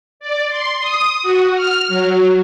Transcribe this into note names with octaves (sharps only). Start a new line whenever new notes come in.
D5
C6
D#6
F#4
F6
F#3